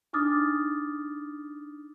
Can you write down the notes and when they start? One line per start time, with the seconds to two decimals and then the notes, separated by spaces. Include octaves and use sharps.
0.13 D4 D#4 D6 D#6 F6 A6